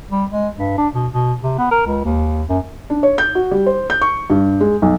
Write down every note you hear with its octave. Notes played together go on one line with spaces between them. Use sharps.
G3
G#3
G2
D4
B2
B2
C3
B3
A#4
C#2
D#2
F#2
D4
C#5
G6
F#4
G3
C5
G6
C#6
G2
G#3
B1